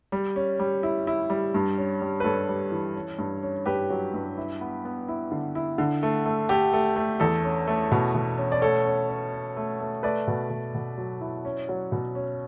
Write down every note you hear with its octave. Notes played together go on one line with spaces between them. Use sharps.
G3
C#4
G3
E4
E4
G3
G2
C#4
G3
B4
G2 A4 C#5
G3
E3
C#4
G2
C#4
G2 G4 B4
F#3
G2
E4
B3
B3
E4
D3
E4
D3
A3
A3
A3 G4
A3
A3
E2 A4
C#4
A3
B2
B2
C#4
D5
A3 A4 C#5
C#4
C#4
C#4
A3
A3
A3 B4 D5
B2
B2
B2
F#3
E4
C#4
F#3
B2
C#4